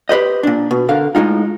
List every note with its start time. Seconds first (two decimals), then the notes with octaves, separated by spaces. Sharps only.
0.09 G4 B4 C5 D#5
0.43 A#2 D4
0.71 B2
0.89 D3 A#4 F5
1.15 A2 G#3 D#4 F4